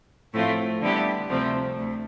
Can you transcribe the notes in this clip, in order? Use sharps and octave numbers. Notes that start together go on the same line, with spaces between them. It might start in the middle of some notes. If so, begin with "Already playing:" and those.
A2 F3 A3 C4 F4
D3 G3 B3 E4 G4
D2 C3 F3 A3 C4
D2